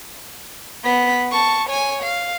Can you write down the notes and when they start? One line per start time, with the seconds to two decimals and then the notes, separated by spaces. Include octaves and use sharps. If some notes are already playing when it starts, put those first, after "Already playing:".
0.84 B3 B6
1.32 A5 C#6
1.69 C#5 G#5
2.03 F5